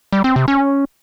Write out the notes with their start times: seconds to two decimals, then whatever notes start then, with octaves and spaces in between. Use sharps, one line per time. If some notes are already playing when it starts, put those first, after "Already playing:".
0.13 G3
0.24 C4
0.36 C3
0.48 C#4